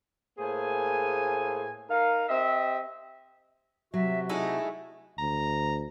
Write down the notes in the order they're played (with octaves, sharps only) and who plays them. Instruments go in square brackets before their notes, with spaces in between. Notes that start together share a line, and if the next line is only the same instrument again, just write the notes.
[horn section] A2 A#3 G#4 C5 G#5
D#4 A#4 F5
C4 G4 D#5 E5
[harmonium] C3 F#4 [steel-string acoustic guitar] F#3 [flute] E5
[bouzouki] G#3 A3 E4 [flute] D#4
[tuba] D2 [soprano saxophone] A#5